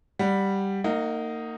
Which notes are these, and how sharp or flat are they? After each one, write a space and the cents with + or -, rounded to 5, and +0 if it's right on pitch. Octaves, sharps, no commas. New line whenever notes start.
G3 +0 F#5 +0
A#3 -30 D#4 +0 F#5 +5